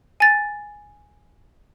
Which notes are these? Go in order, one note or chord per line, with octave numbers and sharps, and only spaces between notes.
G#5 A6